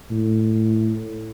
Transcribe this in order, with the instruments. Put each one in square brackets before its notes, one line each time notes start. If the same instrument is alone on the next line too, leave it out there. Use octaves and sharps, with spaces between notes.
[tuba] A2